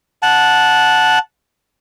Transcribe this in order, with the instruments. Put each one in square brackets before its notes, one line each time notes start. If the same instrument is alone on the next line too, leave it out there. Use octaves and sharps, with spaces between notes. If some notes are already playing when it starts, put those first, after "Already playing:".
[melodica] F#5 A5